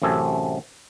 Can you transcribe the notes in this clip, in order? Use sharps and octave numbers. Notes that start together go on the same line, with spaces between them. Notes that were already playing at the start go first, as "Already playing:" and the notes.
A1 F#2 C3 A4 G#5